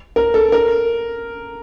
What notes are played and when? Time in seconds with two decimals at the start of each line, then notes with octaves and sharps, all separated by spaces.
0.16 A#4
0.34 A4
0.52 A#4